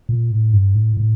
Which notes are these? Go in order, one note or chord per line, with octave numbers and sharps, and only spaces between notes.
A#2
A2
G2
A2
A2